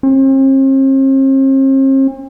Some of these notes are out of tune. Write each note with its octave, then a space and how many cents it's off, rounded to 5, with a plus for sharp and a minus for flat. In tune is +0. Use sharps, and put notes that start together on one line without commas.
C4 +45